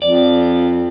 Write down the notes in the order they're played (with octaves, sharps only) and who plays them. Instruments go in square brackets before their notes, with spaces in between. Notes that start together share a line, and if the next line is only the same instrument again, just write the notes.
[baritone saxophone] F2 [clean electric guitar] D5